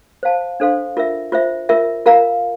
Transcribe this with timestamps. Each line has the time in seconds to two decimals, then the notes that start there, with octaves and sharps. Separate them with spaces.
0.23 C5 F5 A5
0.60 D4 A4 C5 F5 C6
0.97 F4 A#4 E5
1.32 F4 C5 E5
1.69 F4 A#4 E5
2.06 F4 A#4 F5 A#5